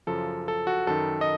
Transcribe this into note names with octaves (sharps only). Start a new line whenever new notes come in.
F#2 C#3 F3 A4
A4
F#4
F#2 D#3 A4
D#5